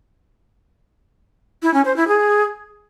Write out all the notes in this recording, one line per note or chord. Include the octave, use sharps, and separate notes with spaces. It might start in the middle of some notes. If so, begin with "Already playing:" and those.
E4
C#4
C5
E4
G#4